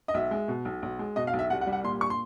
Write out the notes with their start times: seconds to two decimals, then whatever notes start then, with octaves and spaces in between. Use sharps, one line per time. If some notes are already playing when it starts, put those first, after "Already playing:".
0.08 D#5
0.14 B1 E5
0.31 G#3
0.48 B2
0.65 B1
0.82 B1
0.99 G#3
1.16 B2 D#5
1.27 F5
1.33 B1
1.39 E5
1.50 C2 F#5
1.61 F#5
1.67 G3
1.73 F#5
1.84 A#2 C6
2.01 C#6
2.10 C6